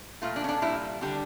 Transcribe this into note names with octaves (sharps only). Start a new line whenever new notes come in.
A#2 A3 F4
D4
C#4
D4
A#2 G3 E4
D3 G3 D4